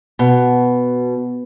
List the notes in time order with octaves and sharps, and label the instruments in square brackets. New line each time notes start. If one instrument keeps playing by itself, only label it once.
[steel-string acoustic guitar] B2